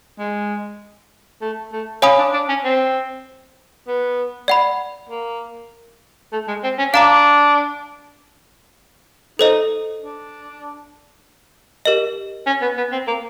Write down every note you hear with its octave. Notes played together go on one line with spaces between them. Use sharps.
G#3
A3
A3
C#4 C#5 F5 G#5 B5 D#6
D4
D4
C#4
C4
B3
D5 F#5 B5
A#3
A3
G#3
C4
C#4
D4 F5 A#5 D6
D#4 A4 C5 D#5
D4
G4 A#4 D#5
C#4
B3
B3
C4
A#3